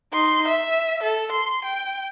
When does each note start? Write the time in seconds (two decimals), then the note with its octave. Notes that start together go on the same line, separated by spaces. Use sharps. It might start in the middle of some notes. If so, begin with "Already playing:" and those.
0.13 D#4 C6
0.48 E5
1.03 A4
1.32 C6
1.65 G5